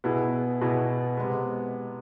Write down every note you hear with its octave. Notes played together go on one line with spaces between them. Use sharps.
B2 B3 E4 G#4
B2 B3 E4 G#4
C3 G#3 B3